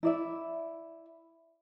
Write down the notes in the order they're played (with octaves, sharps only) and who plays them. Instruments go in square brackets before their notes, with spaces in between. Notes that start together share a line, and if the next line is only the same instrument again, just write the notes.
[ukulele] E4 D5 E5